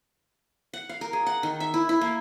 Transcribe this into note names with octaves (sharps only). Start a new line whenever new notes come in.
F#5
F5
A#4
G#4
F#5
D#3
E5
E4
E4
A#3